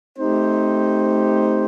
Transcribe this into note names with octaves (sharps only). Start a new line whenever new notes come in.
A3 C4 D#4 G4 C5